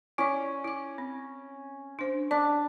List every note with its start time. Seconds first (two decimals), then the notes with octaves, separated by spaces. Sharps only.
0.18 C#4 E4 D5
0.65 E4 D6
0.98 C4
1.99 D4 C5
2.31 D4 D5